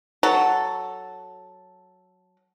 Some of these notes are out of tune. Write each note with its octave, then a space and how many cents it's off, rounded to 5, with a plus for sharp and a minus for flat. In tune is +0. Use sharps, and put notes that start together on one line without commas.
F#3 +0 A4 +0 F#5 +5